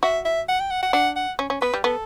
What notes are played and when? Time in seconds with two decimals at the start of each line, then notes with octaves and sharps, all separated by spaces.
0.03 F#4 E5
0.25 E5
0.49 F#5
0.60 G5
0.70 F#5
0.82 F#5
0.93 D4 F#5
1.16 F#5
1.39 C#4
1.50 C#4
1.61 B3 B4
1.74 G3
1.84 B3 A4